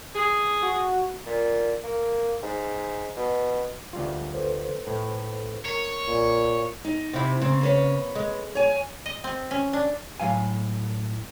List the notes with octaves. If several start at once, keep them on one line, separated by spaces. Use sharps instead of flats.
G#4
F#4
A#2
A#3
G#2
B2
D2 G3 F4
A4 B4 C5
A2
A#4 C#5
B1 A#2
D#4
C3 E4
C#3 C4
A#3 B4 C#5
G#3
C#5 G#5
D#5
C4
C#4
D4
A2 F#3 F5 G#5